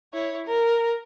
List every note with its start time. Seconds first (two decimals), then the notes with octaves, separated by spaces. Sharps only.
0.13 E4 C#5
0.46 A#4